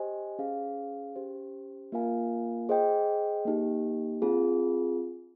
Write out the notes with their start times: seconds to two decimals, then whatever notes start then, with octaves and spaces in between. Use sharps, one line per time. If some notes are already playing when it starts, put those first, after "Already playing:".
Already playing: G4 C5 D#5 G#5
0.39 C#4 G#4 C5 F5
1.16 C#4 G4 C5
1.92 A#3 F4 A#4 F5 G#5
2.69 G#4 C5 D#5 G5
3.45 A#3 D#4 G4
4.22 C4 F4 G#4